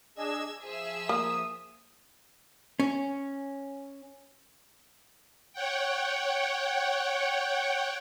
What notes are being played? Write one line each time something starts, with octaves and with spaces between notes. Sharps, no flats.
D4 G#4 D#5 E6 G#6
F3 G#4 E5 E6
A#3 D#6
C#4
C#5 F#5 G5